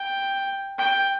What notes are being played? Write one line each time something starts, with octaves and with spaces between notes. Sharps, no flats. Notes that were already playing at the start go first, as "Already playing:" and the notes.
Already playing: G5
G5